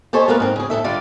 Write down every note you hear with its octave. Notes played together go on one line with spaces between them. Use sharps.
G4 A4 C5 C#5 D#5 G#5
G#3 A#3 B3 F4 A#4 B4
G#2 C4
C#3 G#4
G#2 D#3 A4 E5
D3 G3 F4 D5